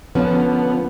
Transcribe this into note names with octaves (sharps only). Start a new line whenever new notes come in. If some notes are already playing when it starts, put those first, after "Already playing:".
D3 F3 B3 C#4